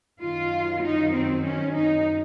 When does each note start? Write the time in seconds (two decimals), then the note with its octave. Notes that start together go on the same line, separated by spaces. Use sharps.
0.22 F#2 D#3 F#3 F4
0.83 D#4
1.14 C4
1.44 C#4
1.75 D#4